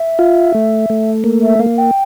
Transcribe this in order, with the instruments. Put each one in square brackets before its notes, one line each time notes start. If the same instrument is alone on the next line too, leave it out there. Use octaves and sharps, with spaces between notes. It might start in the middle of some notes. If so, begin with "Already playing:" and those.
Already playing: [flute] E5
[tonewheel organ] F4
A3
A3
A#3
[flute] E5
[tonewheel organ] A#3 [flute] F5
[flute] G5